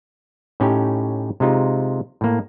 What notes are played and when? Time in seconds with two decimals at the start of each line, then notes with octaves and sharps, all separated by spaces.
0.60 A2 C#4 D#4 G4
1.40 C3 G#3 D#4 F4
2.21 A2 A#3